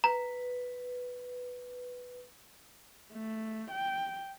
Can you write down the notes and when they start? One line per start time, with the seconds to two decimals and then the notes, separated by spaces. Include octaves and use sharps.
0.04 B4 A#5
3.13 A3
3.71 G5